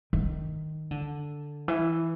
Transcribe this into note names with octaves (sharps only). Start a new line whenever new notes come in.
D#3
D3
E3